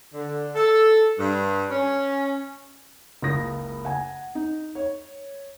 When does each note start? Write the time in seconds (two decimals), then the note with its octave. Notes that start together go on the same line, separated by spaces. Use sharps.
0.14 D3
0.55 A4
1.19 G2
1.71 C#4
3.22 F#1 C#2 D#6 A#6
3.85 F#5 G#5
4.35 D#4
4.75 C#5